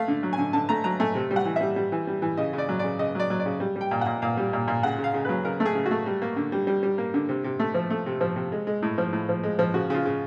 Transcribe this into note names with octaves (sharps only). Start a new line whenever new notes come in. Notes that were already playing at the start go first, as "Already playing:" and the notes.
Already playing: A3 F5
D3
F#3
G#5
D3
D3 A5
A3 A#5
F#3 A#5
A3 G#5
C3
G3
F#5
E3
G3 E5
G3
E3
G3
E3
C#3 D#5
C#3
D5
F#3
C#3 D5
C#3 D#5
F#3 D5
F#3
D5
C#3
G3
G3
G5
A#2
A#2 F#5
A#2 F5
G3
A#2
A#2
C#3 F#5
C#3
F5
C#3
F#3 B4
C#3 A#4
A3
G#4
C#3
F#4
A3
G3
A#3
D3
G3
G3
G3
A#3
D3
C3
C3
A3
F3
A3
C3
F3
C3
G#3
G#3
A2
F3
A2
F3
G#3
F3
C#3 F#4
C#3 F4
C#3